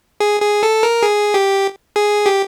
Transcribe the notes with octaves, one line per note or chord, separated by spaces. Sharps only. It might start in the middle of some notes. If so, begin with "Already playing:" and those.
G#4
G#4
A4
A#4
G#4
G4
G#4
G4